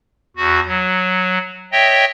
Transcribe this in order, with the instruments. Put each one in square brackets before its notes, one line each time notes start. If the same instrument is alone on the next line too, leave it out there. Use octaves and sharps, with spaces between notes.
[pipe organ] E2 F#4
F#3
C#5 D#5 E5 G5